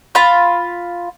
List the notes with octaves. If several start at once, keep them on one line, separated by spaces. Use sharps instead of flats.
F4 F5 B5